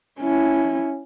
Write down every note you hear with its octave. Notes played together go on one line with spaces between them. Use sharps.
C#4 E4